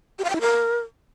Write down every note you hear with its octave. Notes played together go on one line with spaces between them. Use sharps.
G4
F5
G5
E4
A#4